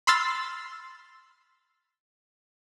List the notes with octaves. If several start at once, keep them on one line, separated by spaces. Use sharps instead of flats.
B5 C6 E6 F6 A6